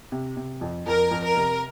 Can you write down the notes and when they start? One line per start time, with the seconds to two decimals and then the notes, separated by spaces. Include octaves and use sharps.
0.12 C3
0.37 C3
0.61 F2
0.87 F2 A#4
1.11 F2
1.24 A#4
1.36 C3